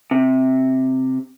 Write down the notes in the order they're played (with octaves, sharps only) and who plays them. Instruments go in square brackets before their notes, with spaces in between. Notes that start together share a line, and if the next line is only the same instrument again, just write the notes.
[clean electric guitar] C3